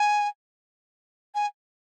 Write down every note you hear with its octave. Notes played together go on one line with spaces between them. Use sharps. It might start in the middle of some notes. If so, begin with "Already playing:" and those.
Already playing: G#5
G#5